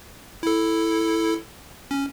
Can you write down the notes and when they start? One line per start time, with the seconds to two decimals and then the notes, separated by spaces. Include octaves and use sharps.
0.43 E4 A4
1.91 C#4